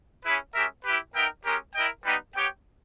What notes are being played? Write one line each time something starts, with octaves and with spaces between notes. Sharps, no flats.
C#4 E4 G#4 B4
G#3 C#4 G4 A#4 E5
E4 G4 B4
B3 D#4 A#4 E5 G5
G#3 C#4 G4 A#4
E4 A#4 D#5 G5
G3 B3 D#4 G4 B4
B3 G4 C#5 G5